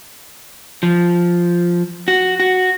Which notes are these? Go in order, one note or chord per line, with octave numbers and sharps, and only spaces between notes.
F3
F#4
F#4